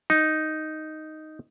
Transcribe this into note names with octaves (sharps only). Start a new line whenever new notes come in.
D#4